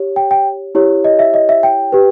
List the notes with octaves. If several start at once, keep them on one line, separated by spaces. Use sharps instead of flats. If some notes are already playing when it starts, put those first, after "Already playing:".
Already playing: G4 C#5
G5
G5
E4 G4 C#5
D#5
E5
D#5
E5
G5
G4 B4